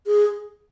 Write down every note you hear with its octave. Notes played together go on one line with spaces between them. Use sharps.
G#4